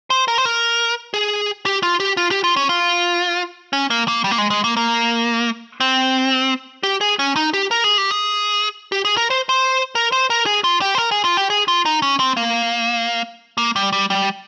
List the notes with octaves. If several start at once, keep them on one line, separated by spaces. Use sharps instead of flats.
C5
A#4
C5
A#4
G#4
G4
F4
G4
F4
G4
F4
C#4
F4
C#4
A#3
A#3
G3
A#3
G#3
G#3
A#3
A#3
C4
G4
G#4
C#4
D#4
G4
A#4
G#4
G4
G#4
G4
G#4
A#4
C5
C5
A#4
C5
A#4
G#4
F4
G4
C5
A#4
G#4
F4
G4
G#4
F4
D#4
C#4
C4
A#3
A#3
G3
G3
G3